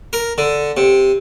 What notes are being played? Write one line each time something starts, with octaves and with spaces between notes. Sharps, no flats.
A#4
D3
C3